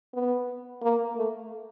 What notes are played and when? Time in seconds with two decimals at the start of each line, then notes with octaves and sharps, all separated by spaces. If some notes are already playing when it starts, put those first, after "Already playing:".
0.14 B3
0.82 A#3
1.16 A3